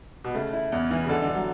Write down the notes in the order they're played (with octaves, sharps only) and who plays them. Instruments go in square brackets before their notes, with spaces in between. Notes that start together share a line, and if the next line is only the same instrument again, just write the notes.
[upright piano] B2
[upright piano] C#3 [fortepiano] A3
[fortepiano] E4
E2
E3
[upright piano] C#3
[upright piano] D3 [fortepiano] A4
[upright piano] D3
[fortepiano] A4
[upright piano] F#3